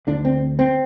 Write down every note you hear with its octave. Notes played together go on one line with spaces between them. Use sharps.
D2 D3 D4
C4
C4